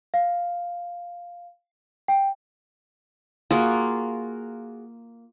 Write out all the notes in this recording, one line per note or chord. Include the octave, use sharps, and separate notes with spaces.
F5
G5
A#3 F4 F#4 G#4